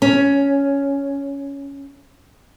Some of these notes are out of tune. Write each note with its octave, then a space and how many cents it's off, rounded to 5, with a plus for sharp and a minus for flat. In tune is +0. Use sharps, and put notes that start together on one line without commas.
C#4 +10